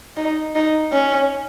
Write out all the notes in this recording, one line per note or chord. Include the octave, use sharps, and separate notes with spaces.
D#4
D#4
C#4